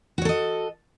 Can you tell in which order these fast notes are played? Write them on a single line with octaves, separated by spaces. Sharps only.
F#4 C#5 A4 D#5